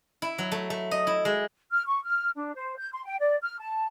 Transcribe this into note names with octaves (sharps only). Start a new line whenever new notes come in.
E4
F#3
A3
A3
D#5
E4
G#3
F6
C#6
F6
D4
C5
G6
C6
G5
D5
F6
A5